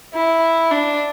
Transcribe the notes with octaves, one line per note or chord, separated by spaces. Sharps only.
E4
D4